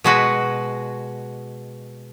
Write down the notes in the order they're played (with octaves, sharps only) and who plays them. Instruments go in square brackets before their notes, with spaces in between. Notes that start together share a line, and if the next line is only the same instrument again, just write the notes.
[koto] B2 G#3 F#4 B4